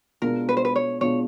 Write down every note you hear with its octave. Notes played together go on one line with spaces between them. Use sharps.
B2 G#3 B3 D4 F4 A#4
B4
C5
B4
C#5
B2 G#3 B3 D4 F4 C#5